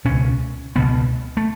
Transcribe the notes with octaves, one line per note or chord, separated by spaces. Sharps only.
C#2 B2 C#4
C#2 B2 B3
A3